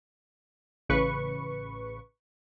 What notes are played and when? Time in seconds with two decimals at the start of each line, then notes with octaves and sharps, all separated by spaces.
0.89 A1 C#3 B4 C#6